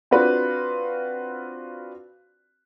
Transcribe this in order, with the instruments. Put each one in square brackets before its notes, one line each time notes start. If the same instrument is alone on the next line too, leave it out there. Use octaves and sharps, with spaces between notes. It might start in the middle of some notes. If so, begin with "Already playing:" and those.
[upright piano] C4 D4 F4 F#4 B4